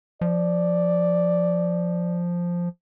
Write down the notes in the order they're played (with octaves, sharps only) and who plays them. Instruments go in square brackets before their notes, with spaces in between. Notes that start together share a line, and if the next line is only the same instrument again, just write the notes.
[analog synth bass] F3 [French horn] D5